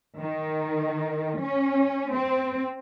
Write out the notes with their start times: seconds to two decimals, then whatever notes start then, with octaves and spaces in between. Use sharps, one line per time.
0.19 D#3
1.41 C#4
2.14 C4